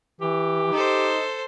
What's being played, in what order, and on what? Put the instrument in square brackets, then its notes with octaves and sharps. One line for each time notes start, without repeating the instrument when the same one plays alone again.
[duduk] E3 [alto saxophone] G4
[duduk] D#4 [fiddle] A4 C5